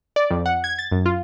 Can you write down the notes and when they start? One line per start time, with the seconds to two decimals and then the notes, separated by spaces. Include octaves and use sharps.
0.16 D5
0.30 F2
0.46 F#5
0.64 G#6
0.79 A6
0.92 F#2
1.06 F4